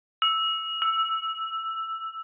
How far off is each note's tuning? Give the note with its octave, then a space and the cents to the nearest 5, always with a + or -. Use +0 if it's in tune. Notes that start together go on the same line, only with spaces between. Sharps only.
E6 -5
E6 +5